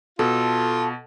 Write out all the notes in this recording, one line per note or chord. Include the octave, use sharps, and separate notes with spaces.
B2 F4 A4